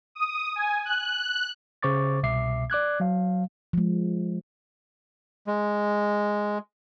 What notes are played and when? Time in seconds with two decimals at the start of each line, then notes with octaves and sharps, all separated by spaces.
0.15 D#6
0.56 G#5
0.85 F#6
1.83 C#3 C5 C#6 D6 A6
2.23 C2 B2 E5 D6 C7
2.70 D5 D6 F#6 G#6
3.00 F#3 F5
3.73 F3 G#3
5.47 G#3